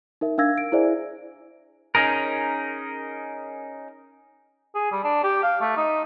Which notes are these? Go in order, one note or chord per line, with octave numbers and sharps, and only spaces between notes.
D#4 A#4 E5
D4 A#4 F5 E6 G#6 A#6
D7
E4 G#4 C5 D5 E5 G#5
C#4 D#4 G#4 A#4
G#4
G3
D4
G4
F5
A3
D#4